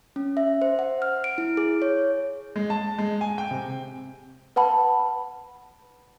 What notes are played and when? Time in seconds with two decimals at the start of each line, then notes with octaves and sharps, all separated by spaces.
0.16 C#4
0.37 E5
0.62 C5
0.79 F#5
1.02 F6
1.24 D7
1.38 E4
1.57 G#4
1.82 C#5
2.56 G#3
2.70 A5
2.98 G#3
3.21 G#5
3.38 G5
3.51 C3
4.56 B4 F#5 A5 B5